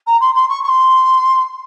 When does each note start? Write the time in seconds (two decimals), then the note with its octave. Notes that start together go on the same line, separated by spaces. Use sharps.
0.07 A#5
0.21 C6
0.35 C6
0.49 C#6
0.63 C#6
0.68 C6